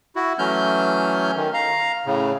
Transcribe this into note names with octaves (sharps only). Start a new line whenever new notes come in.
E4 F#4
E3 F#3 A3 C#4 F6 G6
D#3
F5 A#5
A2 C#3